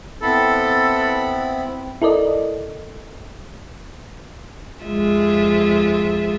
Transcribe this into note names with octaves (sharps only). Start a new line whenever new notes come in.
B3 C4 E4 A4 B5
E4 A4 A#4 D5 D#5
F2 G#3 F4 E5